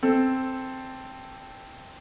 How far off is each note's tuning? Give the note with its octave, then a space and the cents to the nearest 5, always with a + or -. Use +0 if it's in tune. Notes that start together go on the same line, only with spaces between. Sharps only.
C4 +0 A4 +0